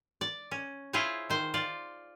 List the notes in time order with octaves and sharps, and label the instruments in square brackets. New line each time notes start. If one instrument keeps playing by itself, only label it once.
[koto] D5
C#4
E4 F4 G#4 C5 C#5
D#3 C5
F4 D5